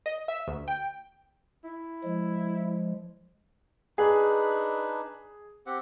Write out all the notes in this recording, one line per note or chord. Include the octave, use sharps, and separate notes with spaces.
D#5
E5
D2
G5
E4
F3 G#3
D4 D#4 G#4 B4
C4 G4 F#5